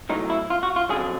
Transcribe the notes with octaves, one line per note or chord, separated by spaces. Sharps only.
B1 A2 F#3 D#4
E4
F4
F#4
F4
F2 D3 F#3 G#4